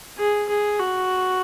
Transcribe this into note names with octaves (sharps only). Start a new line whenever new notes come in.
G#4
G#4
F#4